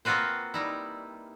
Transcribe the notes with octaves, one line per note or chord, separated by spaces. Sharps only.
A#3 C4 F4 F#4 B4 C5
G3 D#4 E4